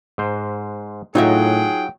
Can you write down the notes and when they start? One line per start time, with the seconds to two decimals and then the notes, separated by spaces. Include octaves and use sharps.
0.18 G#2 C5
1.15 A2 F#3 D#4 F4 G#4 E5 F#5 G5